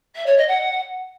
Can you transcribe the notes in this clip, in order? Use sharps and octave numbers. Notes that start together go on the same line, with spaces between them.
E5
C#5
D#5
F#5